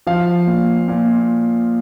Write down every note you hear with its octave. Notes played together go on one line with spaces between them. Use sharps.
F3 F5
A#2
A#2